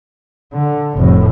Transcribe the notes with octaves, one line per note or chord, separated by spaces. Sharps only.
D3
F1 A2